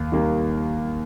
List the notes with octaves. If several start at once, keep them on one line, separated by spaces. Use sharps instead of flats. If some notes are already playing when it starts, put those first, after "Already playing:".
Already playing: D#2
D#3 G3 A#3